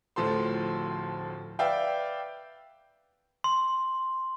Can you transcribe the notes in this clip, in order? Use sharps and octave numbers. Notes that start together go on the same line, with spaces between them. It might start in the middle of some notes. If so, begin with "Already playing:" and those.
D1 A2 F3 A4 C6
B4 D5 E5 F5 G5
C6